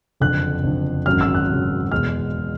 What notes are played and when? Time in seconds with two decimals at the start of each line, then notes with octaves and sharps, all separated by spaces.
0.20 F#1 F2 D3 F#6
0.63 F#1 F2 D3
1.06 G#1 F#2 C#3 F#3 F6
1.21 E6
1.34 F#6
1.49 G#1 F#2 C#3 F#3
1.91 E2 B2 G#3 F6